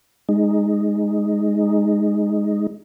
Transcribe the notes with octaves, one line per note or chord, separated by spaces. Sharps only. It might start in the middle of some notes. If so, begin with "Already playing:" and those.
G#3 D#4